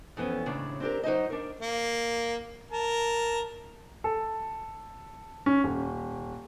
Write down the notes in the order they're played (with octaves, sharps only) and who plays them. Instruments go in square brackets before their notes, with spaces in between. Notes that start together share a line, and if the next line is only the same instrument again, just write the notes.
[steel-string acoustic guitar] F2 E3 B3 C#4
D#2 A2 C#3 D4
C4 D4 G4 A#4
F#3 D#4 C5 D#5
D4 A#4
[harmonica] A#3
A#4 A5
[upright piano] A4
C#4
D#1